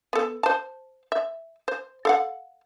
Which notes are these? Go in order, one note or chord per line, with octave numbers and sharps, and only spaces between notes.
B3 A4
C5 A5
E5
C5
A4 F5 F#5